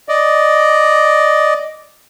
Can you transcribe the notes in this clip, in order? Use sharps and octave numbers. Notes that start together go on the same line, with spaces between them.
D5 D#5